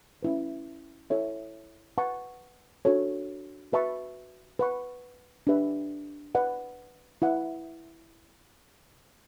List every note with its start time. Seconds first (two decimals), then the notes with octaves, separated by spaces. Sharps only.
0.23 C#4 E4 B4
1.10 E4 A4 C#5 E5
1.98 B4 F#5 A5 C#6
2.85 D4 F#4 A4 C#5
3.72 F#4 B4 E5 A5 C#6
4.59 B4 F#5 C#6
5.47 D4 G4 B4 E5
6.35 B4 D5 F#5
7.22 E4 B4 F#5